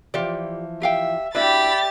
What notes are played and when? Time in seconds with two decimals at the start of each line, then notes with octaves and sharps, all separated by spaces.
0.14 E3 F3 F4 G4 D5
0.82 G4 E5 F5 G5
1.35 D4 E4 F#4 G4 D5 E5 B5 A6